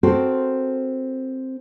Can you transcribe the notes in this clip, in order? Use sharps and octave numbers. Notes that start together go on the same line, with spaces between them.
C4 F#4 A4 A#4 C5